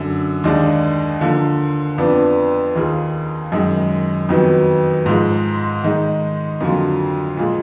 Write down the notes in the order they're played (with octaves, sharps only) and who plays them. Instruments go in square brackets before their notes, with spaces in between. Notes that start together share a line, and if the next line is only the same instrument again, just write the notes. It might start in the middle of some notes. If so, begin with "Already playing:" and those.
Already playing: [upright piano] F#2 D3 F#3
D#2 D#3 G#3 D4
D3 F3 A#3
F2 F3 B3 D4
D#2 D#3 A#3 F4 G#4
F#2 D#3 G#3
F2 D#3 F#3 B3
G#2 F3 G#3
D#3 G#3 D#4
F2 D3 F#3 A#3 F4
A#2 F3 G#3